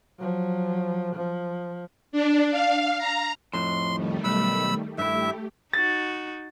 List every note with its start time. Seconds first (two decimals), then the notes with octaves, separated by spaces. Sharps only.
0.19 F3 F#3
1.15 F3
2.12 D4
2.51 F5
2.98 A#5
3.54 F2 A2 C6
3.90 D#3 G3 A3
4.24 B1 B5 E6
4.98 G2 A3 E4 G4 E5
5.73 D#4 F#4 A6